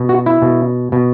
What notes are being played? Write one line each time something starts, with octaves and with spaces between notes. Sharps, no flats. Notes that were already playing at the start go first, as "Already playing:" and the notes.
Already playing: B2
F#4
E4
B2
B2